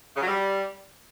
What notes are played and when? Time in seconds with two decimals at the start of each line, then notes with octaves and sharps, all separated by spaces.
0.15 C#3
0.21 F#3
0.27 G3